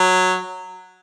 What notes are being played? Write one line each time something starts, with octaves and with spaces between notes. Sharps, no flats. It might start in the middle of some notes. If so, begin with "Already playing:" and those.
Already playing: F#3